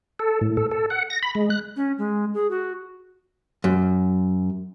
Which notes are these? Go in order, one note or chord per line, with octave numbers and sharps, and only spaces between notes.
A4
A2
A4
A4
F#5
A#6
B5
G#3
F#6
C#4
G#3
G#4
F#4
F#2